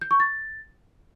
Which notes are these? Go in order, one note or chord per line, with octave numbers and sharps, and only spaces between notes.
G6
C#6
A6